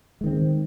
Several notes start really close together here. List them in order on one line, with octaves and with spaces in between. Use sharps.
G#3 D#3 C4